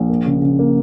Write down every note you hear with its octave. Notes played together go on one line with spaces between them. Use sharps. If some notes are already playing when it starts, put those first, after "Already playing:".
Already playing: A#1
A#3
C#3
C#3
A#3